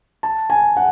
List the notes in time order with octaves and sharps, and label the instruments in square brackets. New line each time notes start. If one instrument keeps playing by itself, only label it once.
[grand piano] A5
G#5
F#5